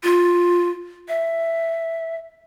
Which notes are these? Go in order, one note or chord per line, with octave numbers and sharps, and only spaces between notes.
F4
E5